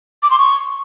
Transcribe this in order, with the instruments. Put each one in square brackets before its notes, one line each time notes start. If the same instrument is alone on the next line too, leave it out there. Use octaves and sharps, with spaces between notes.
[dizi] D6
C6
C#6